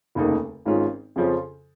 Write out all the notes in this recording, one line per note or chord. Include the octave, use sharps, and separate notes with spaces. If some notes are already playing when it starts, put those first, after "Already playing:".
F1 D#2 C#3 A#3 D#4
G#1 G#2 G#3 C#4 F4
F2 C#3 F3 C#4 F4